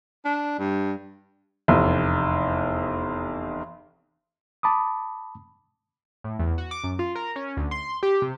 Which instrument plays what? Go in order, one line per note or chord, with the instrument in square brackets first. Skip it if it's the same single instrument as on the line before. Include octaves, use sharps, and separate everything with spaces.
[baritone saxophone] D4
G2
[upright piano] F1 E2
[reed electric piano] A5 B5 D6 D#6
[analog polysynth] A2
E2
F#4
D6
F#2
F4
A#4
C#4
D2
C6
G4
C3